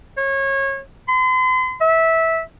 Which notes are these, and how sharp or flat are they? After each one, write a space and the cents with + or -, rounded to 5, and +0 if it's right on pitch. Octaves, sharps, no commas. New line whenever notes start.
C#5 -25
C6 -40
E5 -15